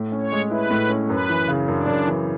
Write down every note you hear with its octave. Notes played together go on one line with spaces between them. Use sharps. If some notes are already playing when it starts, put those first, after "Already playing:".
Already playing: A2
C#4
C#5
G#3
E4 B4
A2
C#4
F#2 B4
E3
C#3
F#2 D4
F#2
E3